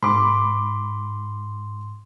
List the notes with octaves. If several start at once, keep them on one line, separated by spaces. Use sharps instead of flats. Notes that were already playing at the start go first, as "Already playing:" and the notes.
G#2 B5 C6 D6